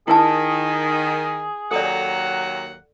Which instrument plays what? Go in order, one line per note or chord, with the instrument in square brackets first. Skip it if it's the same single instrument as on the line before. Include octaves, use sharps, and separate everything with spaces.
[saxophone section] D#3 [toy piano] E4 A#4 A5 [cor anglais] G#4
[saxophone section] D#2 F#3 F#5 [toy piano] A4 D5